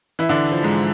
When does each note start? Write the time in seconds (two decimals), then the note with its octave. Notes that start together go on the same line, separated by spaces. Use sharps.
0.19 E3 E4
0.29 D3 D4
0.52 F3
0.63 G#2 G#3